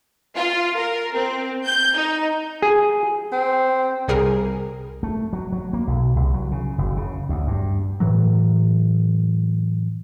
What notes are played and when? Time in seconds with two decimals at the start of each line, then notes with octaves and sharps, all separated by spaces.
0.36 F4
0.77 A#4
1.15 C4
1.66 G6
1.96 D#4
2.62 G#4
3.32 C4
4.08 C2 G3 G#4 A#4 C7
5.03 A3
5.33 F#3
5.53 F#3
5.73 A#3
5.87 B1
6.16 C2
6.34 F#3
6.51 C#3
6.78 F#1
6.97 C#3
7.29 D2
7.47 G2
8.00 A2 E3 F#3